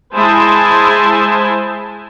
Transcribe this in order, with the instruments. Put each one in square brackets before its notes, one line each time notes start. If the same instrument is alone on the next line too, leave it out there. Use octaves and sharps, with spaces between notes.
[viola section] G#3 E4 C5 G#5 A5